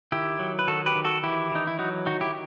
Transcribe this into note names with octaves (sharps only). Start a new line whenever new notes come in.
D#3 E4 G4
F#3
B4
D#3 F#4 A4
G4 B4
D#3
F#4 A4
E3 E4 G4
E3 D#4
E4
F#3 D#4 F#4
D#3 D#4 F#4
E4 G4